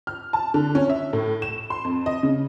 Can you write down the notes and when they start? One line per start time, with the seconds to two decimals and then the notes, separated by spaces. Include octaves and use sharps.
0.07 F6
0.33 A5
0.54 D3
0.75 C#4
0.90 E5
1.13 A2
1.42 E7
1.70 C6
1.84 F2
2.06 D#5
2.23 C#3